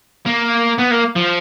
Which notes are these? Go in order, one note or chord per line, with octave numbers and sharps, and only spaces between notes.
A#3
B3
A#3
F3